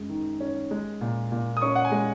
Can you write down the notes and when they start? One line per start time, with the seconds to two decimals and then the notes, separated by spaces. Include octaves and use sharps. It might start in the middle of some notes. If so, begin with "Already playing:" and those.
Already playing: F#2 G#3
0.09 D#3
0.40 C#4
0.71 G#3
1.01 A#2
1.32 A#2
1.57 D#6
1.62 C#4 C#6
1.76 F#5
1.85 G#5
1.92 G#3